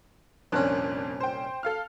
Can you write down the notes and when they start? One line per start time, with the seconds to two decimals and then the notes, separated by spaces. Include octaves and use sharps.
0.52 C2 F2 A#2 C#4 D4 F#6
1.20 C5 G5
1.63 A4 F5 F6